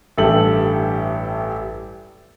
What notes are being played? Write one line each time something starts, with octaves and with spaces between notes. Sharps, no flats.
A1 G2 G4 A4 E5 F#7